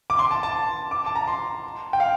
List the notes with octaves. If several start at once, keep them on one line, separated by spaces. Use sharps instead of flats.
D6
C6
A5
A5
D6
A5
A#5
C6
G5
F5